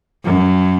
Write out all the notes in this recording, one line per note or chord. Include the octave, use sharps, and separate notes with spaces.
F#2